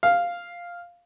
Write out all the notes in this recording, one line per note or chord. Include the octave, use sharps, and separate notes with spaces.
F5